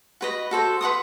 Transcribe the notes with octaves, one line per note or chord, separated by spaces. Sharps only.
F#4 B4 D#5
F#4 A4 C5
B4 F#5 C6 D#6